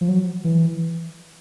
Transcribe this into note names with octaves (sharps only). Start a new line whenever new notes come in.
F3
F#3
E3